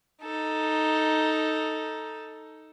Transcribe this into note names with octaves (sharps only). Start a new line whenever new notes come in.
D#4 A4